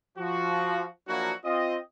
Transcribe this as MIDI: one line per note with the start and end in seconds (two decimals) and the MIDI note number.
0.18 0.86 53
0.18 0.86 66
1.08 1.32 53
1.08 1.32 54
1.08 1.32 58
1.08 1.32 62
1.08 1.32 64
1.08 1.32 66
1.44 1.77 60
1.44 1.77 65
1.44 1.77 75